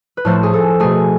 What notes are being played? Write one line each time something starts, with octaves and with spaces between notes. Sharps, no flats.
B4
A2 F3 A3 C5
G#4
A4
B2 A3 G#4